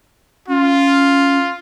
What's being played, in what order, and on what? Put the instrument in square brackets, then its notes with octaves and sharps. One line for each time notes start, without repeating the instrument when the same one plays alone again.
[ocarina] C#4 [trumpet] F4